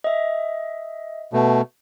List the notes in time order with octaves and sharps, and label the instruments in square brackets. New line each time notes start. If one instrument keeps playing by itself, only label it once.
[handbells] D#5 E5
[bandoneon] B2 A3